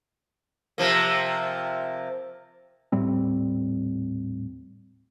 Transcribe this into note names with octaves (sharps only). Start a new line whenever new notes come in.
C3 F3 A#3
D#1 A2 G3 C4